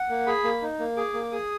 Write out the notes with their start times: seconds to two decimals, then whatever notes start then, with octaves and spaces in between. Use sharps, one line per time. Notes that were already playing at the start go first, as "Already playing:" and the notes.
Already playing: F#5
0.09 A#3
0.27 G#4 B5
0.44 A#3
0.62 D#4
0.79 A#3
0.97 G#4 D6
1.14 A#3
1.32 G#4 D#6